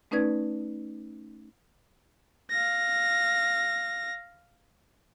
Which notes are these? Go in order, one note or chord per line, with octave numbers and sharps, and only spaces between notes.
A3 C#4 D#4 B4 D5 G#6
F5 A#6